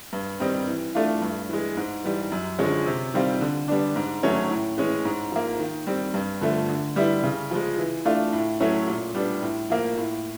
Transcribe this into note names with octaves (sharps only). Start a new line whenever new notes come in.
G2
D#3 G3 C4 D#4
E3
A3 D4 F4
G2
E3 G#3
G#2
E3 G3
F#2
D3 F3 G#3 C#4
C3
D#3 G3 C4 F4
D3
G3 B3 D4
G#2
D#3 F#3 A3 C#4
A2
E3 G#3 C#4
G#2
F3 A#3
D#3
G3 C4
G2
D3 F3 A3
D3
G3 B3 E4
C#3
F3 G#3
E3
A3 D4 F4
A2
F#3 A3 C#4 E4
A#2
G3 B3 D4
A2
F3 A#3
A2